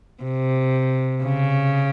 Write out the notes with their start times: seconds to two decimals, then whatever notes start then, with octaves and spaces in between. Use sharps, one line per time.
0.23 C3
1.24 C#3